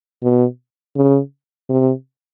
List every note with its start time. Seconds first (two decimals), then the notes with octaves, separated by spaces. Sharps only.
0.23 B2
0.96 C#3
1.69 C3